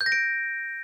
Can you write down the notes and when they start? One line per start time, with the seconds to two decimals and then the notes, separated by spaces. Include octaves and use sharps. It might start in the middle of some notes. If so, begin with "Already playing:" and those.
0.01 G6
0.06 A#6
0.12 D7